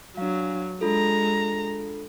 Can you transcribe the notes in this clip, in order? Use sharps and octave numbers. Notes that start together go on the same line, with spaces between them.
F#3 D4 F5
G#3 D4 F4 A4 A#5